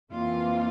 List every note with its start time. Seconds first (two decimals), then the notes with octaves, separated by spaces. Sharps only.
0.12 F2 E3 A#3 F4